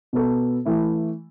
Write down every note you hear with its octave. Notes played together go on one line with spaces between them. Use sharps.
B2 B3 A4
E3 A3 E4